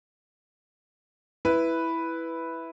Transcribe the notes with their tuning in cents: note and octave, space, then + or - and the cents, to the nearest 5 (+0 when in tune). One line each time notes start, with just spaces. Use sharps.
E4 +0 B4 +0